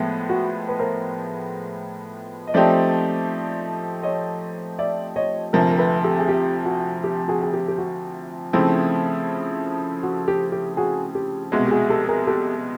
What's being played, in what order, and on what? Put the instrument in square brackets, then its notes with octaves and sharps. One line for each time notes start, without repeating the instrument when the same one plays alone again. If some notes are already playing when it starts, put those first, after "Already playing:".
Already playing: [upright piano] A2 F3 G#3 B3
[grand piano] F#4
B4
A#4 C5
D#5
[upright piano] F3 A3 C4 D#4 G4 [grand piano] C5 D5
[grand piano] C#5 D#5
D5 E5
C#5 D#5
[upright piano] D2 C3 F3 [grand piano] A#4 C5
[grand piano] A#4
A4 B4
G4 A4
G#4
G4
F#4
G4
F#4 G#4
G#4
G4
G4
F#4
[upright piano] C#3 F3 A3 C4 E4
[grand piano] F#4
G4
G4
F#4 G#4
G4
[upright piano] C2 B2 G#3 [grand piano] F#4
[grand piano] G4
F#4 G#4
G4 A4
G#4 A#4
G4 A4